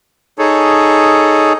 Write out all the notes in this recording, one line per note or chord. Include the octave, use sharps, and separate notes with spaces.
D#4 G#4 A4 C#5